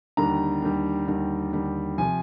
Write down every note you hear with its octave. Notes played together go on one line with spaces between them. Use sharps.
D#2 D3 G3 A#5
D#2 D3 G3
D#2 D3 G3
D#2 D3 G3
C3 F3 G#5